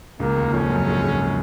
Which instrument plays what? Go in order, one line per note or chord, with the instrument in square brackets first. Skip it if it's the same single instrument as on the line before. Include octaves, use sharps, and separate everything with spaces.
[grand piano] C#2 C#3 [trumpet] A#3
[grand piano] D#2 D#3
[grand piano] F2 F3 [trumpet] C#4
[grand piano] F#2 F#3
G#2 G#3
G#2 G#3
G#3